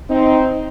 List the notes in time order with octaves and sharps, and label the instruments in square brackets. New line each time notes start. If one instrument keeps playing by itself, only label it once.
[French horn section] C4 D#4